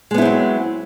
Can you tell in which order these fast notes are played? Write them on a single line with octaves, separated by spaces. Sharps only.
G#3 B3 E4 C4 F#3